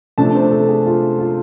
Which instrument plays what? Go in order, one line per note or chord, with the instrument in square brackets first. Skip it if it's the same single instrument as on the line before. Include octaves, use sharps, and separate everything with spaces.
[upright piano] C3 F3 A3 D4 A5
C5
A4
G#4
F4
F4